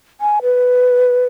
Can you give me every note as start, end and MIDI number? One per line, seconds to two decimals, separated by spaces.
0.21 0.39 80
0.42 1.27 71